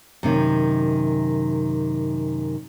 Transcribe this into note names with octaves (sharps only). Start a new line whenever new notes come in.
F#2 C3 D#3